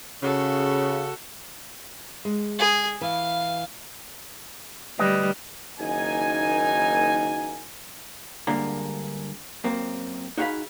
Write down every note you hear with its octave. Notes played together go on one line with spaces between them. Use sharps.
C#3 F#4 A4
G#3
G#4
E3 F5
D2 G3 B4 D#5
F#1 D#3 F#3 A#3 D#4 G#5
G2 D3 G#3 A#3 A#4
F#2 A#3 C4
D#4 F#4 G#4 E5 F5 B5